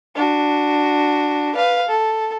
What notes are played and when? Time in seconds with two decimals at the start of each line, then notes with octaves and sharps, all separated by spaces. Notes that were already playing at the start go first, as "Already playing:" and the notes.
0.15 D4 F#4
1.55 B4 F5
1.88 A4